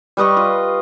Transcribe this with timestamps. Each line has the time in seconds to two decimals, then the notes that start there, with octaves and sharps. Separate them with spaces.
0.17 G3 B4 D#5 C#6
0.37 F4